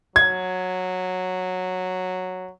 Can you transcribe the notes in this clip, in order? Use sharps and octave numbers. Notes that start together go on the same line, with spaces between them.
F#3 G#6